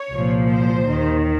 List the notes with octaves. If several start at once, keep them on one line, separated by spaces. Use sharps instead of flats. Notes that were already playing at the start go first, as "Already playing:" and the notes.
Already playing: C#5
C2 A#2 F3
C5
D#2 D#3